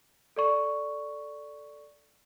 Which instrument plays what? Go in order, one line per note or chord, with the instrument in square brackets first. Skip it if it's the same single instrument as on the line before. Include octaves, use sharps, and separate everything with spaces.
[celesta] A4 D5 C#6